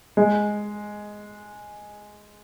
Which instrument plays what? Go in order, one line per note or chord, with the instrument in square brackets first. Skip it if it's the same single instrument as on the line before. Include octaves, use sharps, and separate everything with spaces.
[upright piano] G#3